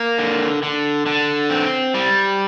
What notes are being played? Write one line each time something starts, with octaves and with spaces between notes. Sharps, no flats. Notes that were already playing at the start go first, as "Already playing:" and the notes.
Already playing: A#3
D3
D3
D3
C4
G3